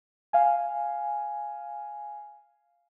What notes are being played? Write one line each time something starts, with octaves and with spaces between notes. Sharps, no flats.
F5 G#5